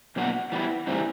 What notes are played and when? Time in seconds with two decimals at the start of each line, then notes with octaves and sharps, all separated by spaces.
0.16 B2 F#3 A#3 D4 F#4
0.52 E3 G3 B3 E4
0.87 A2 E3 G3 C4 D#4